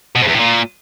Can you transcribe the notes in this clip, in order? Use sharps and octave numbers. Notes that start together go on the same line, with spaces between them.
B2
F2
E2
A2
A#2